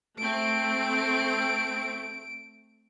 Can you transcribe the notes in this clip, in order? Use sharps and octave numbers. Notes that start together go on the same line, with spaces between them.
A3 C4 D7